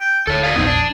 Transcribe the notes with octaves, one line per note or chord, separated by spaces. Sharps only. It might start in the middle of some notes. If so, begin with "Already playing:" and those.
G5
D1 D2 A4 C#5 A5
F#4 G#4 D5 F5
E1 A#1 F2 B3 D#4 C5
D4